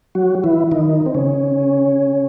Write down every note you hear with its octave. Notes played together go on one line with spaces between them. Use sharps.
F#3 F#4
E3 E4
D#3 D#4
C4
C#3 C#4